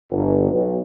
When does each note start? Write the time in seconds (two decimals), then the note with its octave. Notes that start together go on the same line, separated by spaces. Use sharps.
0.11 G1
0.51 B1